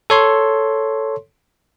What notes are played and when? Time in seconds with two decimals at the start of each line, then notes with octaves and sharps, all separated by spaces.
0.10 A4 C#5 C6